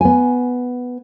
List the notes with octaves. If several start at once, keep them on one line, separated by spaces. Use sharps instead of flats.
B3 G#5